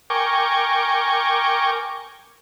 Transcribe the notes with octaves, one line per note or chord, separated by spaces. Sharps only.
A#4 G5 G#5 C#6 D6